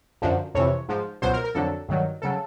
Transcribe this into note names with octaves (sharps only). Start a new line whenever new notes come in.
F#2 D3 F3
F2 C3 E3 C#5
G#2 F3
C#2 B2 F#3 C5
A#4
A#4
F2 D3 F#3 A4
G2 D#3 F#3
C#3 F#3 A4